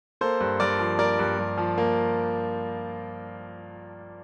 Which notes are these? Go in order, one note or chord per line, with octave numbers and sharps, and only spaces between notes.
A#3 A4 C5
G2
G2 A#4 D5
F3
A#3 A#4 D5
G2
G2
F3
A#3